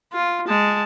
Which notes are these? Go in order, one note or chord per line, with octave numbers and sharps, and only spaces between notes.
F4
G#3 A5